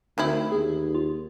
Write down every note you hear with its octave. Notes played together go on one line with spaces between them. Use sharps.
D2 D#3 C4 E4
D#2 G#4
F4